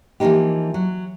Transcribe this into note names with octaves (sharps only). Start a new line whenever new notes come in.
E3 F3 A3 A#3 D#4 G4
F#3